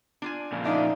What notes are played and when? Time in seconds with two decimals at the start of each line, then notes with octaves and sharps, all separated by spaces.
0.22 D4 F4 G#5
0.52 A#2 C#3 F3
0.65 D4 D#4 E5 F5